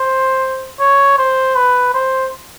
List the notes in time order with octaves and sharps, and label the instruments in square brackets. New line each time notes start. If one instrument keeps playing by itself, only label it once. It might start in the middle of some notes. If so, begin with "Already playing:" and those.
Already playing: [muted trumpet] C5
C#5
C5
B4
C5